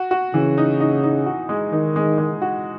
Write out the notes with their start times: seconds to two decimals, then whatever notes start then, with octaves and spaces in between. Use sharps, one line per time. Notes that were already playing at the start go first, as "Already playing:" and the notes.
Already playing: F#4
0.11 F#4
0.34 C#3 E3
0.58 D#4
0.80 D#4
1.03 D#4
1.26 F#4
1.49 G#3
1.72 D#3 D#4
1.96 G#3
2.18 G#3
2.42 F#4